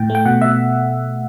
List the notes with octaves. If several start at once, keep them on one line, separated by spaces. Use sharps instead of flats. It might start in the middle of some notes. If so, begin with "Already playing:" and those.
Already playing: A2 G5
A3
G5
B2 F#5
B2 E5